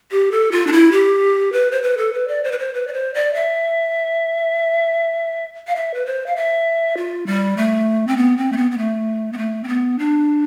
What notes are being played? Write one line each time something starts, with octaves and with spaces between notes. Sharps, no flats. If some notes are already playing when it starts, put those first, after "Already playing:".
G4
A4
F4
D4
E4
G4
B4
C5
B4
A4
B4
D5
C5
B4
C5
B4
D5
C5
D5
E5
F5
E5
B4
C5
F5
E5
F4
G3
A3
C4
B3
C4
A3
B3
B3
A3
B3
A3
C4
B3
D4